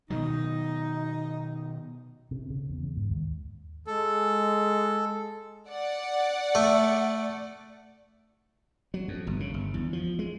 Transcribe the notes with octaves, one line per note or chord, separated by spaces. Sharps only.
B2 D#3 F#3 D#4
C3
C#3
E2
C#3
G#2
D#2
G#3 A4
D5 F#5
A3
F#3
F2
G1
C#3
G1
E2
F3
G#3